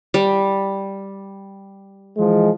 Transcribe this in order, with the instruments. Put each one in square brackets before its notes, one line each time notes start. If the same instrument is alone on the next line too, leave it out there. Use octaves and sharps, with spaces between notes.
[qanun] G3
[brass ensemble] E3 F3 G#3